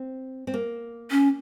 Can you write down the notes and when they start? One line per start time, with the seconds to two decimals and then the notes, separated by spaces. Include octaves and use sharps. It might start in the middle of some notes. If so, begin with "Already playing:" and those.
Already playing: C4
0.47 C4
0.54 A#3
1.11 C#4